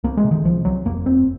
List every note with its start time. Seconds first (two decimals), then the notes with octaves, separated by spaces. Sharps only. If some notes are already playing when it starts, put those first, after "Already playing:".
0.04 C2 A#3
0.17 G#3
0.24 C3
0.31 D#3
0.44 C2 F3
0.65 C2 F#3
0.85 F1 A#3
1.05 F2 C4